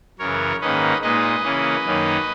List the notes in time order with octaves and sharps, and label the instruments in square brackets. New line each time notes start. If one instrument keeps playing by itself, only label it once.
[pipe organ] F#2 C#3 E3 A#4 C#5
G#2 D#3 A#3 C#4 B4 D#5
A#2 G#3 D#4 B4 D#5
C#3 E3 A#3 C#4
F#2 D#3 A#3 C#4